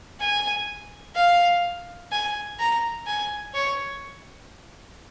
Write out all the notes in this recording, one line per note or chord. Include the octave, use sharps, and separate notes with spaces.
G#5
F5
G#5
A#5
G#5
C#5